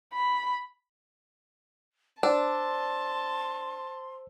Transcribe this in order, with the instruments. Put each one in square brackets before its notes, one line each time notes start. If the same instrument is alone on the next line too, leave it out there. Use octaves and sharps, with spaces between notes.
[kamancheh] B5
[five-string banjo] D4 [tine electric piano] C5 E6 [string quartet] A5 [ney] C6